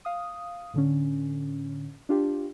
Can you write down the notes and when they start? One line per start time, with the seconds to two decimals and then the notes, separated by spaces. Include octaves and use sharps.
0.05 F5 D#6
0.74 A2 D3 C#4
2.09 D4 F4 G4